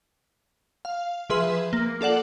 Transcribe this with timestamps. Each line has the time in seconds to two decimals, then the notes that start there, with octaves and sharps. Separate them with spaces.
0.85 F5
1.30 F3 G#4 B4 E5 C6
1.73 A#3
2.01 F4 A4 D5 F#5 F#7